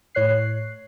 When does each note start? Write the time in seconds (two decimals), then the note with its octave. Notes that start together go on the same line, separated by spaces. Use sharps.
0.15 A2 C#5 F#6 C7